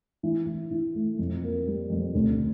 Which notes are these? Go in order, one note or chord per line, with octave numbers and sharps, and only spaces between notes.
E3
E3
E3
A3
F2
A#3
G3
F2
D2